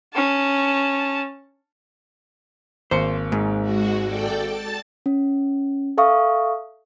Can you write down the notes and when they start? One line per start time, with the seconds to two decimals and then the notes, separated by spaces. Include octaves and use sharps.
0.14 C#4 A5
2.91 G#1 A#3 C5 C#7
3.32 G#2
3.62 G#3 F#4
4.06 A4 D5 G5
4.43 A5 A6
5.06 C#4
5.98 A4 E5 F5 C#6 D#6